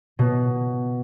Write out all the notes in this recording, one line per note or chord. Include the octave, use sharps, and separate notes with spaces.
B2